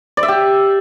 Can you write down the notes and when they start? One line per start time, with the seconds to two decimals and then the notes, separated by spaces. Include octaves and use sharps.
0.17 D5
0.23 E5
0.28 G4